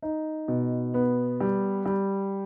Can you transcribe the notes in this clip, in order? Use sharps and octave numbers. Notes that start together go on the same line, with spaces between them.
D#4
B2
B3
G3
G3